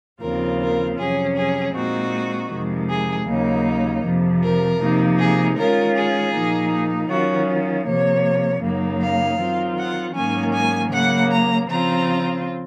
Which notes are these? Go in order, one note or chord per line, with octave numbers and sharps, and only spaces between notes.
D#2 C#3 F3 C4 F4 A#4
A#4
F2 C3 F#3 C#4 G#4
G#4
A#2 G#3 C4 D#4 F#4
F2 C3 D#3 G#3
G#4
D#2 C#3 F#3 A#3 D#4
F2 C3 F3
A#4
C3 F3 A#3 D#4
G#4
D#3 G#3 C#4 F4 A#4
G#4
A#2 F3 A#3 D#4
D#3 F#3 C#4 F4 F#4
C3 F3 A#3 C#5
F#2 C#3 F#3 A#3 D#4
F5
D#3 F#3 C4 F4
F#5
G#2 D#3 F#3 A#3 C#4 G#5
G#5
C#3 F#3 A#3 F#5
A#5
C#3 F3 C4 F4 A#5